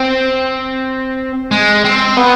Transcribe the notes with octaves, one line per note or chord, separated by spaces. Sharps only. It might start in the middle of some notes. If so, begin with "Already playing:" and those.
Already playing: C4
G#3
C4
B3